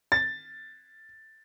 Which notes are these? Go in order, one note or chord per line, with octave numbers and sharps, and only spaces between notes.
A6